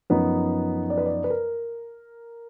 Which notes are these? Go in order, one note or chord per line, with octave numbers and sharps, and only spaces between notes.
F#2 F3 B3 D#4 B4
D5
B4
D5
B4
A#4